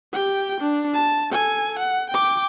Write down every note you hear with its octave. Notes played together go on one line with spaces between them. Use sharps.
G4 G5
D4
A5
A4 G#5
F#5
G5 D6